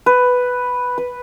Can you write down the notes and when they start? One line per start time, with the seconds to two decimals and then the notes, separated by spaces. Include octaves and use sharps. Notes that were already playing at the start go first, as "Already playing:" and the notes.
0.06 B4
0.98 B4